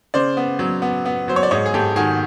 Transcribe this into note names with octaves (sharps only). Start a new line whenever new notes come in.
C#3 C5 D5
B3
F#3
B3
B3
F#3 C5
C#5
D5
G#2 C#5 D#5
G#4
G#2 G4 A4
D#3 F#4 G#4